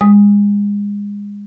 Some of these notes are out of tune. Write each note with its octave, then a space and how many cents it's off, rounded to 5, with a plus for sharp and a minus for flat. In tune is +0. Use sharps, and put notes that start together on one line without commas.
G#3 -30 D#6 +10